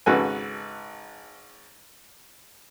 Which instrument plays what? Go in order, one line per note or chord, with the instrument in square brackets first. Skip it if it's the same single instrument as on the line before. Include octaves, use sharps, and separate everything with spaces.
[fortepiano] G#1 C#3 F#4 A4 B4 G#5